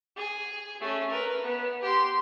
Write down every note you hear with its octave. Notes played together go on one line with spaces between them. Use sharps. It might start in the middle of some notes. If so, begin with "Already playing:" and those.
G#4
A3 C#4
A#4 B4
B3
G4 C6